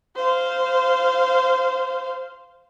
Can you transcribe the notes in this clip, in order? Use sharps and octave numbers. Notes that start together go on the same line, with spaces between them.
C5 F5